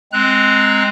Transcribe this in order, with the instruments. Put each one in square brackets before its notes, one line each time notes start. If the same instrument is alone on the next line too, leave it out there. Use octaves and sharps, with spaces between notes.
[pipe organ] G#3 C4 A#5 F#6